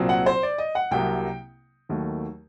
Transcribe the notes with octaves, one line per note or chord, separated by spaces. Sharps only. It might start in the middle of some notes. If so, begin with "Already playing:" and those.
Already playing: C2 A#2 F#3 C4
F#5
C5
D5
D#5
F#5
C2 C3 F#3 A#3 G5
D#2 D#3 F#3 A3